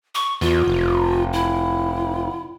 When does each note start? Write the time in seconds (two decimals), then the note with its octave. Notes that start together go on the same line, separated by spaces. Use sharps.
0.15 C#6
0.41 E2 F4
0.68 F1
1.33 E4